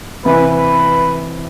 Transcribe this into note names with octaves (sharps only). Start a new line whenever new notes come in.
C3 E3 B3 B4
B4